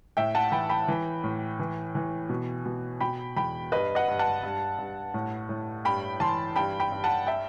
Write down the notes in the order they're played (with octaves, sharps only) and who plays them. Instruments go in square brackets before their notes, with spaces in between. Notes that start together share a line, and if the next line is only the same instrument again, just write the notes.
[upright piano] A2 E5 G5
F#5 A5
E3 G5 B5
G5 B5
E3
A2
E3
E3
B2
B2
B2 G5 B5
E2 G5 B5
G2 B4 D#5
D#5 F#5
G2
F#5 A5
G2
G2
A2
A2
G2 G5 B5
E3 A5 C6
G2 G5 B5
G5 B5
G2
F#5 A5
E5 G5